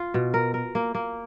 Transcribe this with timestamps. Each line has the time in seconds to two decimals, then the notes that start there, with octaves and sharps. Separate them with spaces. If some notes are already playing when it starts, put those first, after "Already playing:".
Already playing: F4
0.14 B2
0.34 A#4
0.54 A#4
0.75 A#3
0.95 A#3